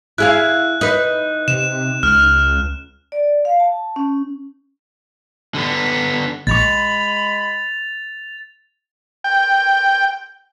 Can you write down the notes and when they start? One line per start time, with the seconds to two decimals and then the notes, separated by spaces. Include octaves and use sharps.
0.18 E4 G#4 F5 F#6
0.81 D#4 B4
1.48 C3 E7
2.03 C#2 F6
3.12 D5
3.45 F5
3.60 A5
3.96 C#4
5.55 D3 B3
6.47 A#1 G#3 B5 C#6 A6 F7
9.24 G5